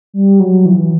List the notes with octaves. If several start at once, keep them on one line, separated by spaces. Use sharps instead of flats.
G3
F#3
E3